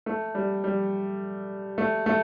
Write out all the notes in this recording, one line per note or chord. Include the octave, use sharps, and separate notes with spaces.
A3
G3
G3
A3
A3